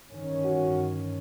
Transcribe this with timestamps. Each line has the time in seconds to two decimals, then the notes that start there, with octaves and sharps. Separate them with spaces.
0.10 G1 D#3 C#4
0.44 F#4